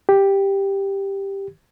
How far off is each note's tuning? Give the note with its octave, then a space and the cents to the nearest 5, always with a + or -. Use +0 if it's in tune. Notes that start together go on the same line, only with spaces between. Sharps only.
G4 +5